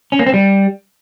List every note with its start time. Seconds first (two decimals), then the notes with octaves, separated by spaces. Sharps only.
0.12 C#4
0.19 A#3
0.26 C4
0.34 G3